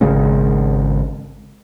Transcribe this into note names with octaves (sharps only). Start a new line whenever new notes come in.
G#1 C#3 G#3 C#4